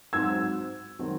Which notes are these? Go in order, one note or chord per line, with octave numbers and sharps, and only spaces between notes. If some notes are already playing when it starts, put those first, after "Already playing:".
G#2 F#3 C4 E6 G#6
D#3 F#3 C4